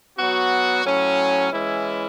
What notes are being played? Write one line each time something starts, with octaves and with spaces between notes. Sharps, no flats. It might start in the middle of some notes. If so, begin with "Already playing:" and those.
F#3 B3 F#4
A2 F#3 C#4
E3 G#3 C#4 E4